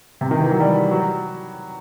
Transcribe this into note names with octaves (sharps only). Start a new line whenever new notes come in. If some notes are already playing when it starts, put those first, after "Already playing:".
C3
D#3
E3
F#3
G3
F#3